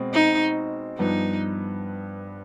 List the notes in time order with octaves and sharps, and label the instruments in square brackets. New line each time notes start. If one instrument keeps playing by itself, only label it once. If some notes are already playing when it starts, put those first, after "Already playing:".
Already playing: [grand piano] B2 G#3 C4
[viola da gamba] D#4
[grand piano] G2 F3 B3 [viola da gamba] D#4